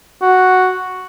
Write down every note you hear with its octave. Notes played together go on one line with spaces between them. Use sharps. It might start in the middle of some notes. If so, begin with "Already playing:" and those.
F#4